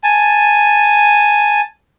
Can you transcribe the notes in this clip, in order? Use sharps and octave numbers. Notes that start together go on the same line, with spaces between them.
G#5 A5